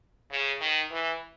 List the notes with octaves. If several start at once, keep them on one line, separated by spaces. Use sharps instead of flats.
C#3
D#3
E3